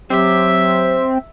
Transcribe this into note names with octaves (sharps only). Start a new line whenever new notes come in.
F#3 C4 G4 E5